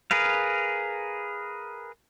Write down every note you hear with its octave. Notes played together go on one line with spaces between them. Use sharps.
G#4 A#4 B4 F5